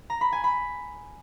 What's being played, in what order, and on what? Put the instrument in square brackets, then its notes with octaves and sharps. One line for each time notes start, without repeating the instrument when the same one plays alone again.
[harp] A#5
B5
G#5
B5